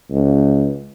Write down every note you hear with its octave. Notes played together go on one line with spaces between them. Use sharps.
C#2